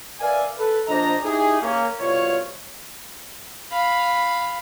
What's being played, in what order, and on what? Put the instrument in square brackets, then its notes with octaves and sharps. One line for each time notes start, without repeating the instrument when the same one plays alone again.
[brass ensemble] A#4 B4 D5 E5 F5 G#5
A4 B4
A#1 D4 C5 D#5 A#5
D#4 E4 G4 G#4
A#3 C#4
C2 B2 F4 C#5
[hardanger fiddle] F5 B5